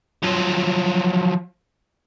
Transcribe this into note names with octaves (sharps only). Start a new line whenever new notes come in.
F3 F#3